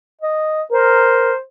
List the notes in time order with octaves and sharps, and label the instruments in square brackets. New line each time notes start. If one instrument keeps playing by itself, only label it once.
[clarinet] D#5
[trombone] A#4 [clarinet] C5